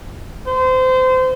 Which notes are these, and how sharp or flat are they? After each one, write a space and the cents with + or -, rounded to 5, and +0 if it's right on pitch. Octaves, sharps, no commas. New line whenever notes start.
C5 -25